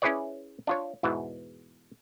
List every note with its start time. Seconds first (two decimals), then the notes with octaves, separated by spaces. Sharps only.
0.02 C#4 E4 G#4 B4 C#5 D5
0.67 D4 F4 C#5
1.03 E2 G#2 B2 E3